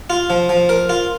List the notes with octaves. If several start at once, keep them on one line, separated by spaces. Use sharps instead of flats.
F4
F3
F3
A#4
F4